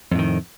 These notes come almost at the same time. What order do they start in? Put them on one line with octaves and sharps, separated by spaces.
F2 A2 D#3